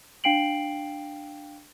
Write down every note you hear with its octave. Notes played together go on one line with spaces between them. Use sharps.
D4 F5 G5 C7 D7 F#7